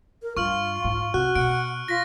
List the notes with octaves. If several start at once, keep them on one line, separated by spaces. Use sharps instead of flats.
A#4
G2 F4 C#6 F6 F#7
G#2
C3 F#4 F#6
B2 F#5 D7
F4 A#6 B6